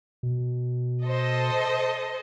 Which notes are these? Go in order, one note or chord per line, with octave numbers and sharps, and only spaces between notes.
B2
A4 C5 D#5